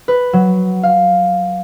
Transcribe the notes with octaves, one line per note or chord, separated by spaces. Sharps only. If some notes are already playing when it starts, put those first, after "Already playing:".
B4
F#3
F5